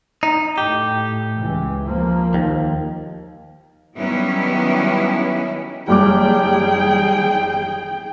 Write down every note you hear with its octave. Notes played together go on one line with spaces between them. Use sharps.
D#4
A2 G4
C#2 E3
F3 A#3
D#2
D#3 F#3 G3 B3 C#4 E4
F#1 G3 G#4 G5 D6